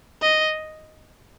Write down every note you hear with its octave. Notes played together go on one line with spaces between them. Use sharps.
D#5